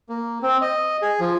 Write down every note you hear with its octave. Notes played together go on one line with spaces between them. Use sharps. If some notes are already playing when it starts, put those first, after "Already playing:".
A#3
C4
D#5
G#4
F3